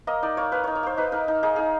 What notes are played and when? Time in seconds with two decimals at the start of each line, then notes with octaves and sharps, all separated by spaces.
0.07 A#3 D#5
0.22 D#4 D5
0.37 A#3 C#5
0.52 A#3 B4
0.64 D#4 C#5
0.75 C#5
0.83 A#3 C5
0.97 D#4 B4
1.12 D#4 A#4
1.28 D#4
1.43 D#4 G#4
1.56 D#4 G#4